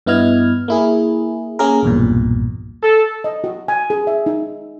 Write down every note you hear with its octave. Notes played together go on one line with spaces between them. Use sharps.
G2 B3 E4 D#5 F6 G#6
A#3 E4 G#4
A#3 C#4 G#4 A#4
B1 E2 G2 A#2
A4
D#5
F#4
G#5
G#4
E5
D#4